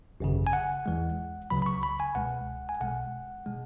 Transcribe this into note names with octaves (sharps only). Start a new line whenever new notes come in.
G#1 F#2 C#3
G#5
F#5
E2 E3 G#3
C#2 C#3 F#3 B5
B5
C#6
B5
G#5
C#2 B2 G#3 F#5
G#5
B1 B2 G#3 F#5
B2 G#3